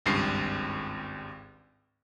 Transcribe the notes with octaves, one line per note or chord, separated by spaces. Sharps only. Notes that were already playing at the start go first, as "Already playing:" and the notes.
G#1 C#2 G2 C7